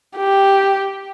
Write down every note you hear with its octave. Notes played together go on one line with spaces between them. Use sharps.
G4